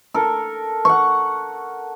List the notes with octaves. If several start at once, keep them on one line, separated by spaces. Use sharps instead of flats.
A4 A#4
F#5 C#6